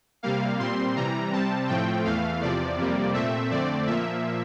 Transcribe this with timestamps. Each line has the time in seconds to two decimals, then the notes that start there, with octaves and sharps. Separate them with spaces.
0.23 C3 G3 A#3 F5
0.59 A#2 G3 C4 C6
0.96 C3 E3 G3 A#5
1.32 C3 G3 C4 A5
1.68 A2 F3 A3 C4 G5
2.05 E2 E3 A3 F5
2.41 E2 C3 F3 D5
2.78 F2 C3 G3 A#3
3.14 A#2 A3 C4 E5
3.50 F2 D3 A3 C4 D5
3.87 A#2 F3 A#3 E5